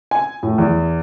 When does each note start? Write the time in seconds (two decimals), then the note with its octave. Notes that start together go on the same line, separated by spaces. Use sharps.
0.11 G#5
0.43 A2
0.58 E2